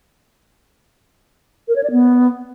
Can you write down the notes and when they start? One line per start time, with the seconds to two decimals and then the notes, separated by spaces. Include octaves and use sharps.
1.68 A#4
1.76 C#5
1.83 D5
1.91 B3